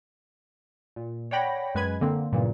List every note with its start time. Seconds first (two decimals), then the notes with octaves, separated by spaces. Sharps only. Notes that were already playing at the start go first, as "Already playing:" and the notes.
0.96 A#2
1.31 C#5 D5 F#5 G5 B5 A#6
1.75 F#2 G#3 B4 G#5 B5 G#6
2.01 D3 A#3 C4
2.32 B1 G2 A#2 C#3 E3 A#3